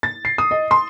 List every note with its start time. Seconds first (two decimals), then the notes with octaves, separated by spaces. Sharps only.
0.03 A6
0.25 C7
0.38 D#6
0.51 D#5
0.71 C6